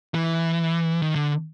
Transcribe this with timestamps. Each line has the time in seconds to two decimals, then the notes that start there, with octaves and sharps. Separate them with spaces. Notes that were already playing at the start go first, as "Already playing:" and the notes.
0.14 E3
1.02 D#3
1.16 D3